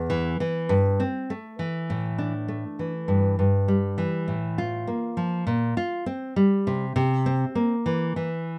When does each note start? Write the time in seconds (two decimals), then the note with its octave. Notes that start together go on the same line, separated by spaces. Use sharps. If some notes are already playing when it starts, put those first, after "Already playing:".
Already playing: E2
0.10 E3
0.40 E3
0.69 G2
1.00 C4
1.30 A3
1.59 E3
1.90 A2
2.18 D4
2.48 A3
2.79 E3
3.08 G2
3.39 G2
3.68 G3
3.98 E3
4.28 A2
4.58 F4
4.87 A#3
5.17 F3
5.47 A#2
5.77 F4
6.06 C4
6.36 G3
6.67 C3
6.96 C3
7.26 C4
7.55 A#3
7.86 E3
8.16 E3